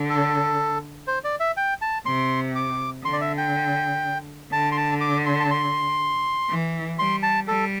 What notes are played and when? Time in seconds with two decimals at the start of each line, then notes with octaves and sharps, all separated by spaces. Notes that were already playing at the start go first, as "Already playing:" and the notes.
Already playing: D3
0.09 A4
1.07 C5
1.24 D5
1.40 E5
1.57 G5
1.81 A5
2.06 C3 C6
2.56 D6
3.04 D3 C6
3.13 D5
3.21 E5
3.38 G5
4.52 D3 A5
4.72 C6
4.77 A5
5.01 D6
5.26 C6
5.40 A5
5.51 C6
6.50 E3
6.98 G3 C6
7.23 A5
7.47 G3 A4